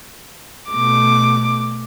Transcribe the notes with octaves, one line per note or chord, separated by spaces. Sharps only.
B2 A3 D6